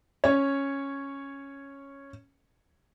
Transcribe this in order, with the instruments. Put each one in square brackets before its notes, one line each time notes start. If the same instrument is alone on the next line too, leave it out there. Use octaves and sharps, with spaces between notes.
[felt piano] C#4 C#5